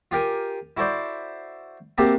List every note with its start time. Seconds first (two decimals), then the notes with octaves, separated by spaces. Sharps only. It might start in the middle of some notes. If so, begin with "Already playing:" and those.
0.11 F4 G4 A#4 G#5
0.77 E4 F#4 A4 C5 D5
1.98 C3 A#3 F#4 G4 A4